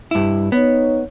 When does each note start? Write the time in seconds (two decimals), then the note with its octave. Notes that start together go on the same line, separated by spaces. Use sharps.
0.11 G2 E4
0.52 B3 D#4 C#5